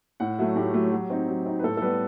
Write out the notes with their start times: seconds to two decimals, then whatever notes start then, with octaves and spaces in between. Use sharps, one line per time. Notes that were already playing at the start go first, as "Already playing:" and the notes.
0.20 A2 F#5
0.39 F#3 A3 E5
0.56 A2 G4
0.74 F#3 A3
0.92 F#3
1.10 C4 D#4
1.28 F#3
1.46 C4 D#4
1.59 B4
1.64 A2 A4
1.77 A4
1.82 G3 B3 B4